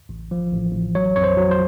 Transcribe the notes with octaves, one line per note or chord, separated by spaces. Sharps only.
A1
F3
A1
A1
F#3 C#5
F2 C#5
C5
F#3
C5